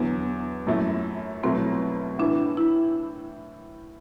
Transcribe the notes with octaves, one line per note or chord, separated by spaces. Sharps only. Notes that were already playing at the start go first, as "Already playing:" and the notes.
Already playing: E2 D3 F#3 B3
F#2 F#3 A3 E4
C2 B2 F#3 A3 C4 E4
A2 E3 B3 D4
E4